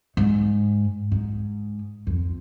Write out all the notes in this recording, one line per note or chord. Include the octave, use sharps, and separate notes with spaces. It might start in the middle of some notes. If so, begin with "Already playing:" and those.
G#2
G#2
F2